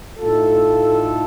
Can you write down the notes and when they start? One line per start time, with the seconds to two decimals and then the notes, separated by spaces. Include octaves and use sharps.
0.17 A2 A3 D#4 F4 A4